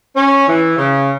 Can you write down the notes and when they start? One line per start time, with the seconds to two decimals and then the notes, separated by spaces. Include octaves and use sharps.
0.16 C#4
0.47 E3
0.78 C#3